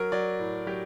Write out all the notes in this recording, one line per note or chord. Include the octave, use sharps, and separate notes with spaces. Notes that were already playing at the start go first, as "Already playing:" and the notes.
Already playing: F#3 A#4
F#3 D5
A2
F#3 G4